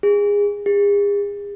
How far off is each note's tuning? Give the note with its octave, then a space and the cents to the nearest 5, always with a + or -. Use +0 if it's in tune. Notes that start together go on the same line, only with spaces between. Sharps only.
G#4 -25
G#4 -40